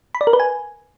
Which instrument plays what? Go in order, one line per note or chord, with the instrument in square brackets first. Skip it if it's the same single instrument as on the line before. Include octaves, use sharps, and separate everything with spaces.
[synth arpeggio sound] B5
D5
A#4
B4
G#5